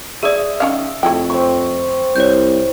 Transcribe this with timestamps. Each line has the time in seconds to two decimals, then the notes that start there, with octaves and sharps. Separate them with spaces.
0.23 G#4 D5 E5 D#6
0.60 D#3 C#4 F5
1.03 F2 A3 E4 G5
1.30 C4 C#6
2.16 C2 C#5 G6